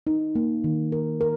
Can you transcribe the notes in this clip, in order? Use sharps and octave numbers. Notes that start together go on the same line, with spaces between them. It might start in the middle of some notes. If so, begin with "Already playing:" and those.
D#4
A#3
D#3
A#4
A#4